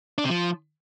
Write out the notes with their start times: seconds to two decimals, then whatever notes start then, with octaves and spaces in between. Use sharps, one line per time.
0.18 D4
0.24 C3
0.30 F3